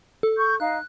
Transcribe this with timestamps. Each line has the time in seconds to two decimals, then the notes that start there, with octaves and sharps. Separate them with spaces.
0.23 A4
0.36 C#6 G6
0.60 D#4 F5 F#6